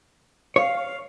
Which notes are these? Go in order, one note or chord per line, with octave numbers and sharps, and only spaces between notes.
C#5 F5